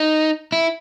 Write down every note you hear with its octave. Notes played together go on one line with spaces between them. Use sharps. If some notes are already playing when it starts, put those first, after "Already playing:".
Already playing: D#4
E4